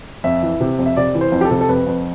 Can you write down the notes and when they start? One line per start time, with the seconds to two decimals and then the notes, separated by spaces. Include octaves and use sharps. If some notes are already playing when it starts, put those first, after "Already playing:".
0.24 F2 E5
0.43 E3
0.61 C3
0.79 F2
0.86 E5
0.97 C3 D5
1.15 E3
1.21 C5
1.32 F2
1.41 G4
1.45 A4
1.51 C3
1.61 A4
1.69 F2 B4
1.87 F2